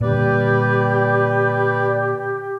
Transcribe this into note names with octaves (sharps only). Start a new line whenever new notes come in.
A#2 D3 G3 G4 B4 D5